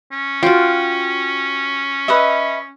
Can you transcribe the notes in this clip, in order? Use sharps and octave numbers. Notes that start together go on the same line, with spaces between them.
C#4
F4 F#4 G5
B4 D#5 E5